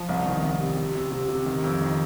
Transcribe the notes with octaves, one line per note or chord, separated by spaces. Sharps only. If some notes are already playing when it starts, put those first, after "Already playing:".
Already playing: F3
C2
D#3
C2
C3
C3
C3
C3
C3
D#3
F2
D#3